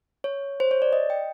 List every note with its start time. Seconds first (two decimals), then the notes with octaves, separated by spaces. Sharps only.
0.24 C#5
0.60 C5
0.71 C#5
0.82 D5
0.93 D#5
1.10 G5